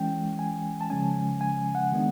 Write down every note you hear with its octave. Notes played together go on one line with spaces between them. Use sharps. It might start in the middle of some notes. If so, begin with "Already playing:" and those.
Already playing: E3 G#3 C#4 G5
G#5
A5
C#3 F3 G#3 C#4 G#5
G#5
F#5
D#3 G#3 B3 D4